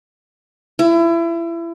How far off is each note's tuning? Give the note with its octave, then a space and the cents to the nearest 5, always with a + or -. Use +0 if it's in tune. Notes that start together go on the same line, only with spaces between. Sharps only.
E4 +30